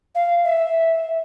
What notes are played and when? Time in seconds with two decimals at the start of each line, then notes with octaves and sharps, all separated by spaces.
0.15 F5
0.44 E5